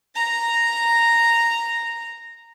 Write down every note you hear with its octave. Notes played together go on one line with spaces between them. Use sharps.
A#5 A#6